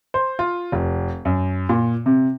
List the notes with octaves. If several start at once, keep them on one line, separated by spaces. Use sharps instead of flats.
C5
F4
F1
F#2
A#2
C3